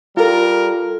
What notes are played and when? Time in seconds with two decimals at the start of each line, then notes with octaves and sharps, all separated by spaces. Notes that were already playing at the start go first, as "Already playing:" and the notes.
0.17 G3 F4 A4 A#4